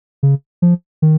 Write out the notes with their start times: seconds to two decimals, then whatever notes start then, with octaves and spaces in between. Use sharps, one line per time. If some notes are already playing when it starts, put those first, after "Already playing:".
0.23 C#3
0.62 F3
1.02 D#3